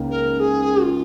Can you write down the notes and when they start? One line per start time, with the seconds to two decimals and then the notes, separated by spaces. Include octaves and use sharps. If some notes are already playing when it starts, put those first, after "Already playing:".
Already playing: C#2 C#3 A#3 D#4
0.10 A#4
0.39 G#4
0.82 F4